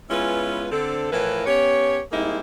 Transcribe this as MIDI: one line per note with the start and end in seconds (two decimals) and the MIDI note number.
0.10 0.66 56
0.10 0.66 59
0.10 0.66 61
0.10 0.66 64
0.10 0.66 65
0.10 0.66 71
0.71 1.10 50
0.71 1.10 60
0.71 1.10 69
1.12 1.45 45
1.12 1.45 52
1.12 1.45 53
1.12 1.45 64
1.12 1.45 70
1.12 1.45 71
1.46 1.99 59
1.46 1.99 61
1.46 1.99 67
1.46 1.99 73
2.12 2.40 55
2.12 2.40 56
2.12 2.40 58
2.12 2.40 60
2.12 2.40 63
2.12 2.40 64